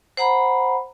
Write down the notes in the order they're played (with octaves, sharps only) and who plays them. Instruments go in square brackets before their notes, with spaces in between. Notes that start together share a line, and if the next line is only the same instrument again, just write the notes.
[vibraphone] C5 F#5 A#5 B5